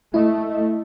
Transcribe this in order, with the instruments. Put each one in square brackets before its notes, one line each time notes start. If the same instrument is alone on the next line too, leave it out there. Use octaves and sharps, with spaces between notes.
[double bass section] A3 [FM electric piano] E4 D#5